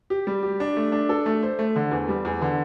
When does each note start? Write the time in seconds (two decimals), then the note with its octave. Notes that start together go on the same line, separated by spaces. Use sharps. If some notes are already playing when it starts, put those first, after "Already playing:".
0.10 G4
0.27 G3
0.43 G4
0.60 D4
0.76 A3
0.92 D4
1.09 A4
1.26 A3
1.43 C5
1.59 A3
1.76 D3
1.91 E2
2.08 G3
2.25 E2
2.42 D3